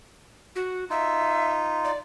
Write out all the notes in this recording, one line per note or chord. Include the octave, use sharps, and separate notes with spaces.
F#4
D#4 F4 E5
D5